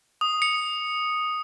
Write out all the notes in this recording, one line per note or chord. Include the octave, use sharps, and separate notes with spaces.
D#6
C#7